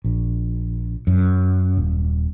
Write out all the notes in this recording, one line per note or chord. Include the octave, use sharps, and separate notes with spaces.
A#1
F#2
D#1